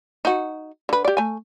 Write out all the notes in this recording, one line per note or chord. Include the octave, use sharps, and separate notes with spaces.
D#4 F#4
D3 B4
G4 D5
A3 G#5